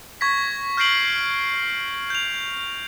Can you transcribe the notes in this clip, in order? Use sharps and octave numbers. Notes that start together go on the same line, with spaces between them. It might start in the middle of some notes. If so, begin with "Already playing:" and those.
C#6 G#6 A#6 B6
F6 G6 A#6 C7 D7 F#7
G6 F7